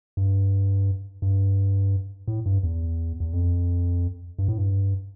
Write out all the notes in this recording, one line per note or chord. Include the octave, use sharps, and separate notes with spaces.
G2
G2
A2
G2
E2
E2
F2
G2
A2
G2